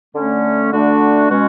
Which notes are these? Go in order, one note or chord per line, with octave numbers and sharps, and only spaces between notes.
D3 A3 C#4
D3 A3 D4 F#4
B2 G#3 C#4 F#4